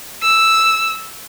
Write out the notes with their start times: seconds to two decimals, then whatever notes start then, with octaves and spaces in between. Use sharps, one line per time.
0.23 E6